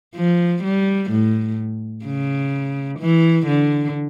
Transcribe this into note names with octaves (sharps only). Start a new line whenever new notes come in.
F3
G3
A2
C#3
E3
D3